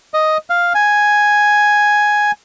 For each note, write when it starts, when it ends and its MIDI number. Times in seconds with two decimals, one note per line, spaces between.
0.14 0.37 75
0.50 0.73 77
0.75 2.31 80